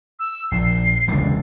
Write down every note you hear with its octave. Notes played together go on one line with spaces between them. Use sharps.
E6
A#1 C7
E1 C#2 D3